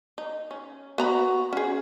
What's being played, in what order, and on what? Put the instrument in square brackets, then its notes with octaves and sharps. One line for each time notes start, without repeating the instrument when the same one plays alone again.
[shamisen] D#4
C#4
[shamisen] B3 A#5 B5 [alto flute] F#4
[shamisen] C#4 G#4